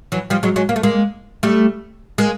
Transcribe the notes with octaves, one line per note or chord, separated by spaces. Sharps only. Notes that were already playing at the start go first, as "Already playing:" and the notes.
E3 F#3
F3 G3
F#3 G#3
F#3 G#3
A#3
A3
G#3 A#3
G3 A3
G#3 A#3